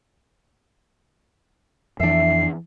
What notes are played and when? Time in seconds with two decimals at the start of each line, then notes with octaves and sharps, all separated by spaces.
2.00 F2 E3 D4 E5 C7